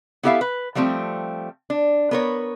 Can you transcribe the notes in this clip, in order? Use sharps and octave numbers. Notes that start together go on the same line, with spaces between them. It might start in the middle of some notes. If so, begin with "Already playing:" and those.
B3 E4 G4 A4 E5 F5
B4
F3 G3 A3 C4 G4
D4
B3 A#4 C#5